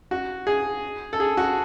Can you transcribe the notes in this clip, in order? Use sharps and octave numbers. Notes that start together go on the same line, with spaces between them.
F#4
G#4
A4
G#4
F#4